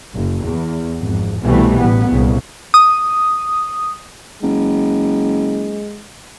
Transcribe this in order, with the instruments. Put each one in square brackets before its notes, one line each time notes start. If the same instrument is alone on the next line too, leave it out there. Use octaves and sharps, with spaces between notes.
[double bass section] F#1
E2
G#1 F2
C2 B2 E3 G3 A3
A1 B3
C2 A#2 C#3
[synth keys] D#6
[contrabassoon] F#1 [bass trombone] G#3